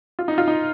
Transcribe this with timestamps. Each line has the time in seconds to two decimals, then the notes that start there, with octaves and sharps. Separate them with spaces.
0.19 F4
0.28 D#4
0.38 F4
0.48 D#4